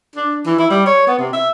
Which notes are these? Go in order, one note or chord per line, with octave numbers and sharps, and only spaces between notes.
D4
E3
E4
G3
C#5
B3
C3
E5